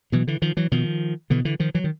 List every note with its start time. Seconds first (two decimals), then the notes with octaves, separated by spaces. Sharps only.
0.12 B2 E3 F#3
0.27 D3 E3
0.42 D#3 F3
0.57 E3 F#3
0.72 B2 D#3 F3
1.30 B2 D3 E3
1.45 D3 E3
1.60 D#3 F3
1.75 E3 F#3
1.84 D#3